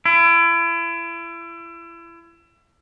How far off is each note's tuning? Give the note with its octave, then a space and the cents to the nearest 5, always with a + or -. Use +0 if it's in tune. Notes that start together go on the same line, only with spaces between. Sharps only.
E4 +35